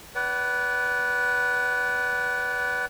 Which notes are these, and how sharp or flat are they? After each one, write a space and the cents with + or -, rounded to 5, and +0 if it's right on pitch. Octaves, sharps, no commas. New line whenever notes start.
B4 +0 D5 -30 F#5 +40